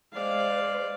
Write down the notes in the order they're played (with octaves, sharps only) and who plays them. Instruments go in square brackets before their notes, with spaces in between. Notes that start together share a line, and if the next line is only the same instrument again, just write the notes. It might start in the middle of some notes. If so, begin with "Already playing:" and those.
[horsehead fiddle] G#3 C5 [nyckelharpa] D5 F5